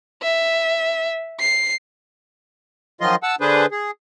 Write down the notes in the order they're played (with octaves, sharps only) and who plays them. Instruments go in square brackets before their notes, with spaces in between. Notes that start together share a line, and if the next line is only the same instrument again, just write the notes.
[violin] E5
C7
[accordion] D#3 F3 F#3 F4 D#5 C6
F#5 A5 E6
D3 D4 G#4 B4 C5
G#4